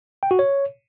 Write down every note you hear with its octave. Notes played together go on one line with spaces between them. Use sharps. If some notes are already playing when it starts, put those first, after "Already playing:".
G5
F#4
C#5